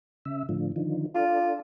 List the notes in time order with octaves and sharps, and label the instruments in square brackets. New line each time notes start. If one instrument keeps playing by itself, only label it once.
[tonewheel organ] C#3 E5
A2 D3 F3
D3 D#3 F3
[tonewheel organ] D4 A4 [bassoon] F4